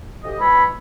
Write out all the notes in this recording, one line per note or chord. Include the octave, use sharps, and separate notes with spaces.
D2 G4 D#5
E3 G#3 C#5 E5 B5